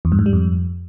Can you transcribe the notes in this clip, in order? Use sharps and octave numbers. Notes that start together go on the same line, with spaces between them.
E2
G2
G#2
G3
F2